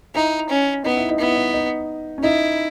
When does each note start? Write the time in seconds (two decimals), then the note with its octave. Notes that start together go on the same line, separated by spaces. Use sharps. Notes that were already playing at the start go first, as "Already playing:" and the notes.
0.15 D#4 E4
0.49 C#4
0.84 B3 D#4
0.97 E4
1.10 D#4
1.18 B3 E4
1.35 D#4
1.54 D#4
2.18 C#4
2.23 D#4 E4